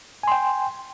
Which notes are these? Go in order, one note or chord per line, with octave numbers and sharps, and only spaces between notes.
G5 G#5 C6